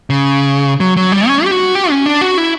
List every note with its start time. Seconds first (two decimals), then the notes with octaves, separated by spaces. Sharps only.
0.10 C#3
0.80 F#3
0.97 F#3
1.12 G3
1.28 C#4
1.45 G4
1.51 F#4
1.75 G4
1.90 C#4
2.06 D4
2.21 F#4
2.38 E4